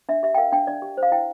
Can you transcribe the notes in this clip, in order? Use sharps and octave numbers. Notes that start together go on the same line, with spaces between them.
D4 E5
G4 E5
G5
A#4 F5
D4 G5
D4 D5
G4
C5
F5
E4 G5